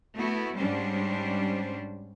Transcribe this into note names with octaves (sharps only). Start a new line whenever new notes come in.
A3 B3 E4 F#4
G#2 G3 C#4 D4 C5